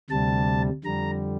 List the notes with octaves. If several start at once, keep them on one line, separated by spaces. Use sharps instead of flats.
D2 C3 G3 A5
F2 D3 G3 A#5